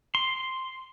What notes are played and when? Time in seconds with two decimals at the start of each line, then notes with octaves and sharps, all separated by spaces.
0.15 C6